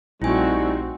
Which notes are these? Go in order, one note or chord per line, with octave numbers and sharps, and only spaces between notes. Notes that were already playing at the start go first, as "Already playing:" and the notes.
A#1 G3 A3 C4 D#4 E4 F#4 G#5